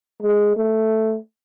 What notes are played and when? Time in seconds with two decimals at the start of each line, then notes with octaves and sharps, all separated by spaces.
0.23 G#3
0.57 A3